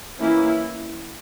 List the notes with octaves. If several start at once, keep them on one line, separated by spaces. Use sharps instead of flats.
E3 A#3 C#4 E4